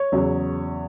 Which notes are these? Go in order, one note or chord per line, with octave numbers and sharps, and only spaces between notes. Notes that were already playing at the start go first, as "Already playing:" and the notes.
Already playing: C#5
E2 C#3 F#3